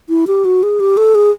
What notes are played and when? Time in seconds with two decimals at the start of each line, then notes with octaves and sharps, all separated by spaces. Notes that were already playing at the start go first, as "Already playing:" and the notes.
0.09 E4
0.27 G4
0.45 F#4
0.63 G#4
0.80 G4
0.97 A4
1.15 G#4